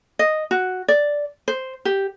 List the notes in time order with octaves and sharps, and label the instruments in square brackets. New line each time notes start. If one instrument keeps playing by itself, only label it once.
[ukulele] D#5
F#4
D5
C5
G4